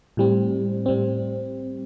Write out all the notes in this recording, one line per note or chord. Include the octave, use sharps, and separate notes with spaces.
A2 G3 C4
A2 G3 C4